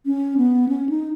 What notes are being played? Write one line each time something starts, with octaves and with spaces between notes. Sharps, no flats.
C#4
B3
C#4
D#4